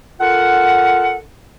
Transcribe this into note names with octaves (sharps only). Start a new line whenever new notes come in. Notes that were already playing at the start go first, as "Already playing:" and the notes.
F4 A4 A#4 F#5